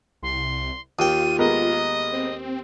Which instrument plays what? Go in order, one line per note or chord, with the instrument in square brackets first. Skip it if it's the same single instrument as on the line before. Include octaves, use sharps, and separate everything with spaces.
[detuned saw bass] C2 [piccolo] C6
[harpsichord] D#2 G5 [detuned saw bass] F4 [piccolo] D#7
[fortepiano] G#3 B3 A#4 [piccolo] D#5
[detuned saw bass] C4